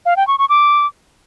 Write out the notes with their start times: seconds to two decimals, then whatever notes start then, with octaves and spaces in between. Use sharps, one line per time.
0.06 F5
0.17 G5
0.28 C#6
0.38 C#6
0.49 D6